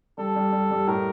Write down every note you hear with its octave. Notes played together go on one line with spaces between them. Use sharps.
G3 A4
G3
G3
G3
A2 A#4